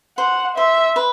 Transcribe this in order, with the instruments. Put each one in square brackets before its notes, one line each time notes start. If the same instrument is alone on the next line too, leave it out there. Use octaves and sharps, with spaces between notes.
[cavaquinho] C5 [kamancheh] F#5
[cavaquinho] C5 [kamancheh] E5
[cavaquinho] B4